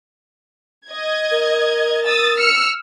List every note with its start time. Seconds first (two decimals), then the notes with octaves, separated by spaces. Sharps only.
0.90 D#5 G#6
1.31 A#4
2.06 D#6 E6 A6
2.37 E6 F6 C#7